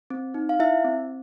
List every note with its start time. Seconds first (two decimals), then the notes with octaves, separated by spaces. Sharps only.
0.10 C4
0.34 D#4
0.49 F5
0.60 E4 E5
0.85 C4